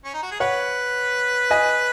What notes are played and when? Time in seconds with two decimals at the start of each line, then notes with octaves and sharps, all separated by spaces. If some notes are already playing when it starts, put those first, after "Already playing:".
0.04 C#4
0.14 D#4
0.22 F#4
0.31 G#4
0.40 B4 C#5 F#5
1.51 D#5 G#5